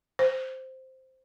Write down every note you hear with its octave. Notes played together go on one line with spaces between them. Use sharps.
C5